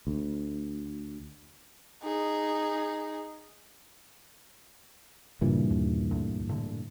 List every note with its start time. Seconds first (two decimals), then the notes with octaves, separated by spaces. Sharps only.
0.07 D2
2.03 D#4 G#4
5.41 G2 A#2 C#3 E3
5.70 D#2
6.11 D2
6.49 A2 D3